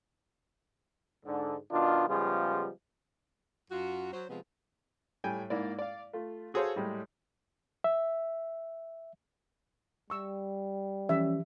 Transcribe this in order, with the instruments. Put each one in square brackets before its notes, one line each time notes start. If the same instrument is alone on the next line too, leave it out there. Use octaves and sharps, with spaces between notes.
[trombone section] G#2 D3
B2 D#3 D4 F4
C#3 F3 G3 G#3 B3 F4
[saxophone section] F#2 F4 F#4
F#3 C5
C3 F3 G#3 B3
[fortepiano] A2 G3 G5 G#5
G#2 A#3 E4 D5
D5 F5
A3 F4
F#4 G#4 A4 C5 C#5 F5
A2 G3 G#3
[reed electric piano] E5
[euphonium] G3 [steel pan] C#6 E6
[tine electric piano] E3 F3 G4 [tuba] C#4 [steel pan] E5